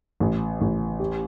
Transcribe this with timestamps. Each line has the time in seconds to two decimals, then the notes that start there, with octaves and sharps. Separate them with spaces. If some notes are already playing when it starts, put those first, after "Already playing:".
0.20 A1
0.61 A1
1.00 G4